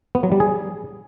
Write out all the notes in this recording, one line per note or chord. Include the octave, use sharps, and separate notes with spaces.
B3
F#3
G3
G#4